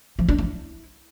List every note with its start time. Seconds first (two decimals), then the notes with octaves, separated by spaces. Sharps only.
0.19 F3
0.29 D4
0.38 E4